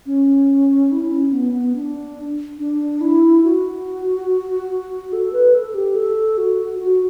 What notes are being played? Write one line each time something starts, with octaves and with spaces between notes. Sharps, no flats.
C#4
E4
C#4
B3
B3
D4
D4
E4
F#4
A4
B4
A4
G4
A4
F#4
F#4